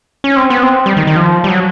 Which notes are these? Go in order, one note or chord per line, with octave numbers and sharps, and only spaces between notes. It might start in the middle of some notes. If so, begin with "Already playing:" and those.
C#4
C4
B3
C4
G3
D#3
D#3
F3
G3
F#3